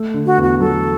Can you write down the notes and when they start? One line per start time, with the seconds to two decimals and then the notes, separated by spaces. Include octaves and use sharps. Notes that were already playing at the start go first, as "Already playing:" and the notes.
Already playing: A3
0.14 D3
0.26 F#4
0.38 E2
0.43 F#4
0.60 F#3 A4